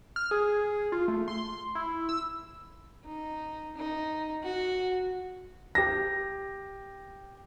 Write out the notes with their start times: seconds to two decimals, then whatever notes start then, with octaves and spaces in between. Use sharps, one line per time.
0.16 F6
0.31 G#4
0.92 F4
1.08 A3
1.28 C6
1.75 E4
2.09 E6
3.05 D#4
3.77 D#4
4.43 F#4
5.75 G4 A#6